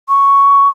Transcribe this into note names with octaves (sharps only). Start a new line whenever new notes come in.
C#6